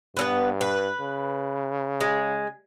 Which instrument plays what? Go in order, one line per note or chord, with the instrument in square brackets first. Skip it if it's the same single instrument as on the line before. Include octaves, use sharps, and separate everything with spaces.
[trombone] G2 [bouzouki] B3 C#4 B4
[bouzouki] B4
[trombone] C#3
[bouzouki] G#3